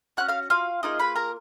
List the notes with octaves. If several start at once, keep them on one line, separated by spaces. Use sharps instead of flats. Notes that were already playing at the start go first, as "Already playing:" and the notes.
C#4 F#4 F#5 F#6
F5 F6
F4 F5
A#3 D#4 F4 G#4 D#5
B4 B5
A#4 A#5